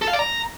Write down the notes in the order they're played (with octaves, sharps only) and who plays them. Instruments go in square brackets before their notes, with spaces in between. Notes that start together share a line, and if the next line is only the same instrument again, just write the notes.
[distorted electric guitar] A4
F5
D5
A#5